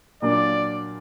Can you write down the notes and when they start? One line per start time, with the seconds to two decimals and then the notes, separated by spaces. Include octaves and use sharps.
0.22 A#2 F#3 A#3 D4 D5